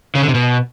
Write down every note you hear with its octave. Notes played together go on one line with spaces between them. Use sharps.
C#3
D3
C3
B2